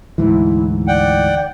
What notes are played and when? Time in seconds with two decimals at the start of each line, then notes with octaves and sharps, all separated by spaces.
0.18 D2 G#2 E3 E4
0.88 D5 F#5 G5